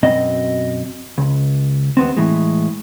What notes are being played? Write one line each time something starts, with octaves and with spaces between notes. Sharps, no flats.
F#2 B2 C4 D#5
C#2
D#2 B3 C4
A2 E3 G#3